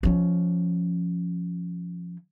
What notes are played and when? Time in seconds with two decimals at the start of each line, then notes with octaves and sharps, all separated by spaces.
0.03 F3 C#4